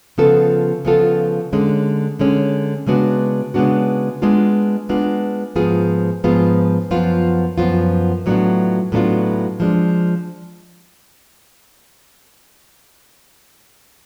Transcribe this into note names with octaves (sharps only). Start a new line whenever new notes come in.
C#3 F3 B3 F4 A4
C#3 F3 B3 F4 A4
D3 G#3 C#4
D3 G#3 C#4
C#3 G#3 B3 D4 F#4
C#3 G#3 B3 D4 F#4
G#3 B3 D4 F4
G#3 B3 D4 F4
G#2 F3 B3 F4 G#4
G#2 F3 B3 F4 G#4
F#2 F3 B3 F4
F#2 F3 B3 F4
A2 F#3 B3 D4 F4
A2 F#3 B3 D4 F4
F3 G#3 D4